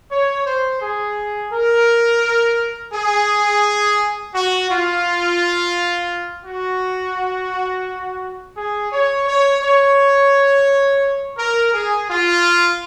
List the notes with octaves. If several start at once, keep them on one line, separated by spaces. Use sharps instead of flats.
C#5
C5
G#4
A#4
G#4
F#4
F4
F#4
G#4
C#5
C#5
C#5
A#4
G#4
F4